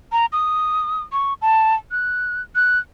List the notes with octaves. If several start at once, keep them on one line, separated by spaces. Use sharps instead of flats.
A#5
D#6
C#6
A5
F#6
F#6